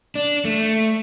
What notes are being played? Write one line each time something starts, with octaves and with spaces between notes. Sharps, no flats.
D4
A3